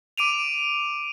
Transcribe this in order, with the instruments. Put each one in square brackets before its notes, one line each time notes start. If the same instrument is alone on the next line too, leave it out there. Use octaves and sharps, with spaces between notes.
[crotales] D6 D7 D#7 F7